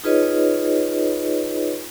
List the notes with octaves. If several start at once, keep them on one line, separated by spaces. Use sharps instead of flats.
D#4 F4 G#4 B4 C#5 D#5